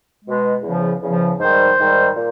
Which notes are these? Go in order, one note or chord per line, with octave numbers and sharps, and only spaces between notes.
B2 G#3
E2 C#3 F3
E2 C#3 F3
G#2 D#3 G3 C5
G#2 D#3 G3
A#2